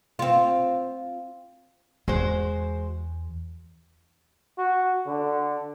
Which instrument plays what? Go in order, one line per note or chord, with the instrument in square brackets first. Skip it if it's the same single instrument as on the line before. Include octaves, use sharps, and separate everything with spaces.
[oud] C4 F4
[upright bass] E2 [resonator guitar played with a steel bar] G#3 F#4 C5
[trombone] F#4
D3